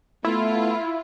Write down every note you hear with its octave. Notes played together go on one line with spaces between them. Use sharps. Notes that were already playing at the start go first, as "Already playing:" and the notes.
A3 B3 E4 F4